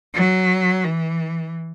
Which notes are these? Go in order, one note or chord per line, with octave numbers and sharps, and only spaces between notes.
F#3
E3